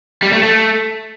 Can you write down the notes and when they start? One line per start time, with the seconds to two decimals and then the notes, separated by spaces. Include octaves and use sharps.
0.23 G3
0.33 A3
0.43 A3